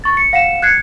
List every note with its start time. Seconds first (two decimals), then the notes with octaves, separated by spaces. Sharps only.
0.04 C#6 A6
0.17 C#7
0.33 F5 F#5 C#7 E7
0.62 F#6 G#6 C7 C#7